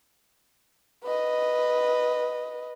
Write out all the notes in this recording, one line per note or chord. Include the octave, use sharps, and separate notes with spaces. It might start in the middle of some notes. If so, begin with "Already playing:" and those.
B4 D#5